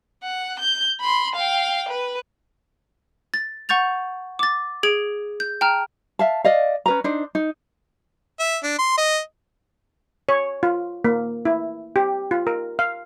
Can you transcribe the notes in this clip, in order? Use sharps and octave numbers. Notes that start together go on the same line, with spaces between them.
F#5
G6
B5 C6
F5 G5
B4
A6
F#5 C#6 G6 A6 F7
D6 A6
G#4 G#6 D7 F#7
G6
G5 A5 A#5 F6
E5 F5 A5
D5 D#5 F5
C#4 B4 A#5
D4 D#4 C5
D#4
E5
D4
C6
D#5
C#5
F4
A#3
E4
G4
F4
A#4
F5